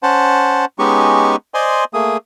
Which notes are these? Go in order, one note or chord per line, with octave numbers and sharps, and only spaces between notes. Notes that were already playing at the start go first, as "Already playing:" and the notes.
C#4 C5 F#5 A5
G#3 B3 C#4 D#4 G4 C#6
C5 D5 D#5 G#5 C6
A3 A#3 G#4 D#6